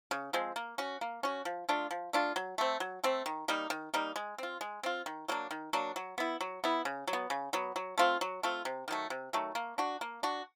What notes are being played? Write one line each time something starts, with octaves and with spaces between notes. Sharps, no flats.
C#3
F3 G#3 C4
A#3
C#4 F#4
A#3
C#4 F#4
F3
A3 D4 F4
F3
A3 D4 F4
F#3
A3 C4
F#3
A3 C4
D#3
G3 A#3 D#4
D#3
G3 A#3 D#4
G#3
C4 F4
G#3
C4 F4
D#3
F#3 A#3 D4
D#3
F#3 A#3 D4
F#3
B3 E4
F#3
B3 E4
C#3
F#3
B3
C#3
F#3 B3
F#3
A3 C4 F4
F#3
A3 C4 F4
C3
D#3 F#3 A3
C3
D#3 F#3 A3
A#3
D4 F#4
A#3
D4 F#4